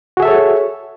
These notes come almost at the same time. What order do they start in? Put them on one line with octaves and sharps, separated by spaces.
F#4 G#4 E5 A4 C#5